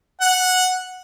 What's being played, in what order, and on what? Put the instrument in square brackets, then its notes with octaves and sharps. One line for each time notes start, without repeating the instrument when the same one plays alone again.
[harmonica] F#5